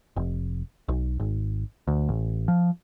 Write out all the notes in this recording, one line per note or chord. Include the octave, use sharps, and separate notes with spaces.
F1
B1
G#1
D2
A1
F3